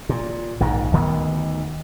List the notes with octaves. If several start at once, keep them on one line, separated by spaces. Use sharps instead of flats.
A#2
A#1 G#2 D#3
D2 D#3 B3